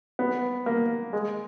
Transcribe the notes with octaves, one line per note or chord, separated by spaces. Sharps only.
B3
A#3
G#3